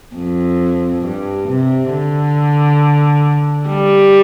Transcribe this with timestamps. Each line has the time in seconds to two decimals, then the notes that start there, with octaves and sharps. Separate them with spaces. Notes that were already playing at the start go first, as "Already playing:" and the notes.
0.15 F2
1.04 G2
1.48 C3
1.92 D3
3.69 G3